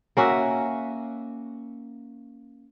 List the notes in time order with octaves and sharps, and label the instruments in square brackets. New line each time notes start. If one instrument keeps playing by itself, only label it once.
[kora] A#3 C#4 F#4 E5